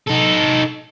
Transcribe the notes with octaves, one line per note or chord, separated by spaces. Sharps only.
D#4 A4